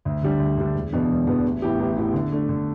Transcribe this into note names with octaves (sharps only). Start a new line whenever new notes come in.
D2
D3 G3 D4
D2
D3 G3 D4
E1
E2 B2 B3 D4
E1
E2 B2 B3 D4
A1
A2 E3 B3 G4
A1
A2 E3 B3 G4
D3
A3 D4
D3